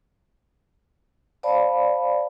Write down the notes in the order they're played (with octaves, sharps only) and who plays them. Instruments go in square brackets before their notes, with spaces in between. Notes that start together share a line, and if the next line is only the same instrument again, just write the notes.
[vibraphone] C5 D5 F5 A5 B5